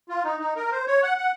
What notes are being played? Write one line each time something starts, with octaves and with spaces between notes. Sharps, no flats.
F4
D#4
D#4
A#4
C5
C#5
F#5
F#5